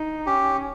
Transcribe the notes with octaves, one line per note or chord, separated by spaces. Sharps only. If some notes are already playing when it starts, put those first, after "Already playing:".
Already playing: D#4
C#4 G4